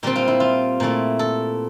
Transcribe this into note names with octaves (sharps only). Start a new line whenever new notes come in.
A#2 G3 C4 G4
F4
E4
F4
A#2 A3 E4
A4